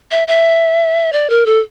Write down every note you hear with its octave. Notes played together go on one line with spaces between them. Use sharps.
E5
E5
D5
A#4
A4